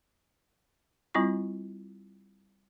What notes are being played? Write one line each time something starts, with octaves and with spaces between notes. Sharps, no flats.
G3 C4 E4 F4 C#6